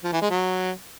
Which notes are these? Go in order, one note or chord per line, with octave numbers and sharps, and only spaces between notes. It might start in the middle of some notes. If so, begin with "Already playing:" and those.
F3
E3
G#3
F#3